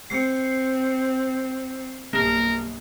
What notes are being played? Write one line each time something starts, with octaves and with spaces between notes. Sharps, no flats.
C4 C7 C#7
B1 G2 A#3 A#4